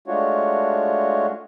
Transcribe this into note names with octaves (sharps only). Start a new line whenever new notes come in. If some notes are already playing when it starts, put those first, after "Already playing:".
G#3 A3 D4 F4 F#4 C#5